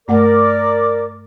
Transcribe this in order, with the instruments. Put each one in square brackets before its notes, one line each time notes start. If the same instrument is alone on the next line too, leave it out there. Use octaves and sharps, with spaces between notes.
[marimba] G2 A3 F#5 [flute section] A#4 D5 D6